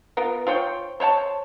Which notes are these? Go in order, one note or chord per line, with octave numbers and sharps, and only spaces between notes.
B3 F4 A#4
F4 C5 C#5 G5
C5 C#5 F5 A5